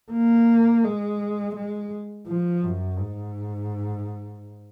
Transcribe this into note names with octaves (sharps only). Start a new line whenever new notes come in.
A#3
G#3
G#3
F3
F#2
G#2